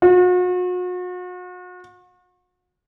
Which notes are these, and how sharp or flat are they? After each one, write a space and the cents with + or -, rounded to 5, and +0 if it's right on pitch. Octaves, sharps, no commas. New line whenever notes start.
F#4 -40